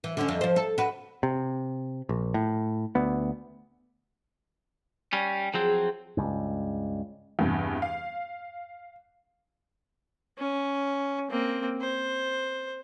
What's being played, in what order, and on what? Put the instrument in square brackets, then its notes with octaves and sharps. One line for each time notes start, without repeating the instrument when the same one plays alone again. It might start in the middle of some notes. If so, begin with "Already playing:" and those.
[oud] E3
D3 C#4
F2
F3 C5
A4
F#4 B4
[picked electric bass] C3
A#1
A2
D2 B3
[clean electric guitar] G3 C#4
[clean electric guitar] F3 F#3 C4 [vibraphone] G#4
[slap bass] C#2 G2
[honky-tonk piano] E2 G2 C3
F5
[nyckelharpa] C#4
A#3 C4
C5